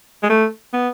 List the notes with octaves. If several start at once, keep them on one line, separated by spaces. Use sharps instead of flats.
G#3
A3
B3